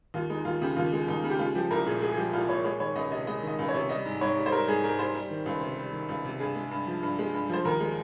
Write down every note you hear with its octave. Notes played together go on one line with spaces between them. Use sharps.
D#2 F4
G#3 D#4
D#2 F4
C#3 G4
D#2 F4
G#3
D#2 D#4
C#3
G4
G#3 F4
F3 G4
C2 A#4
A#2 G#4
G#3 G#4
G#4
F3 G4
C2 F4
A#2 C#5
G#3 C#5
D#3 C#5
C#2 D#5
C3 D#5
G#3 D#5
D#3 D#5
C#2
C#5
C3
G3 D#5
G#2
G#2 C#5
G3
C5
G3 A#4
G#2 G#4
G#2 A#4
G3 C5
G3
D#3
C#2
C3
G3
D#3
C#2
C3
G2 G#4
G#3
G2
F3
G2
G#3
G2
F3 C5
D#2 A#4
G#3